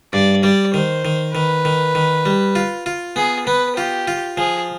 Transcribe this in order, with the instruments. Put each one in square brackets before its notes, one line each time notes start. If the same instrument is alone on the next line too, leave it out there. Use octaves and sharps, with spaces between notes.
[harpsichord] G2 [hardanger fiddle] D5
[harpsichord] G3 [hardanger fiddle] D5
[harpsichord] D#3 [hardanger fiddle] C5
[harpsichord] D#3
[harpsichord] D#3 [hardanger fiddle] B4
[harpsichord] D#3
D#3
G3
F4
F4
[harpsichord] B3 [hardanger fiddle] G#4
[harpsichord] B3 [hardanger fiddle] B4
[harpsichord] F4 [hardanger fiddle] G4
[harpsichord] F4
[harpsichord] F3 [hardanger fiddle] G#4